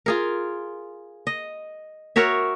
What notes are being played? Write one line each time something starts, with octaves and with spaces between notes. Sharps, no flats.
F4 G#4 A#4
D#5
F#4 A#4 C#5 E5